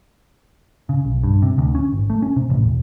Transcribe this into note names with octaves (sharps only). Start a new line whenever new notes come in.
C#3
B1
G2
C3
D2
C#4
G#1
A3
C#4
C3
A1
E1